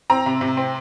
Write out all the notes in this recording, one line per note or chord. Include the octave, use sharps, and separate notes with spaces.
C4 A#5
C3
C3
C4